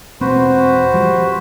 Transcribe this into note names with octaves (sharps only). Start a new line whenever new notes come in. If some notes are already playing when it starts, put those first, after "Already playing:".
E1 C4 F#4 B4 C5
F3 G3